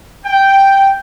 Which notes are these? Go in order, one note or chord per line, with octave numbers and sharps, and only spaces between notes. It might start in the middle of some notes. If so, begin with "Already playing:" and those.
G5